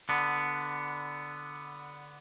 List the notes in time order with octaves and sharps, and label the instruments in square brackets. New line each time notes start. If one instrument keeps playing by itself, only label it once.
[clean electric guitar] D3 B3